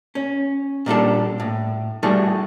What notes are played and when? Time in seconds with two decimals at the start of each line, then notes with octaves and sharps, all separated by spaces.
0.15 C#4
0.86 A#2 G3 D4 A4
1.40 A2
2.03 G3 A3 E4 F#4 G#4 A4